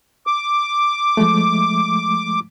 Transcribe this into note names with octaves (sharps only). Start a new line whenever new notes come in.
D6
F3 G#3 A3